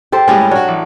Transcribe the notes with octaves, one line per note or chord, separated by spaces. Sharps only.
G4 A4 C5
A2 G3 G#3 C#4
F#3 D4 F#4 C#5
A1